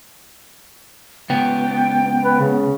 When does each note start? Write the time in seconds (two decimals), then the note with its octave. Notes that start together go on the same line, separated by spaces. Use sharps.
1.30 C#2 B3 G5
2.24 B4
2.39 C#3